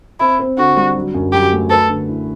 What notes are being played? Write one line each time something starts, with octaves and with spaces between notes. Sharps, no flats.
C4 E4
C4
D3 F#4
G3
F#3
F#2
F#3 G4
A3
A4 B4
D3
E4